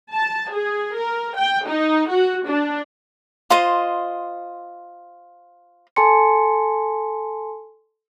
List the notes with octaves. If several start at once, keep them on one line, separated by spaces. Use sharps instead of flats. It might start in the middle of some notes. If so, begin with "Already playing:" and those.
A5
G#4
A#4
G5
D#4
F#4
D4
F4 C5 D#5
A4 G#5 A5 C6 C#7